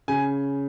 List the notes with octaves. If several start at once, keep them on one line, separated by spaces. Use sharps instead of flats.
C#3 G#5